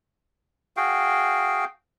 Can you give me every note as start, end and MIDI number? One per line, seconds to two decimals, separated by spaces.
0.77 1.65 66
0.77 1.65 68
0.77 1.65 77
0.77 1.65 79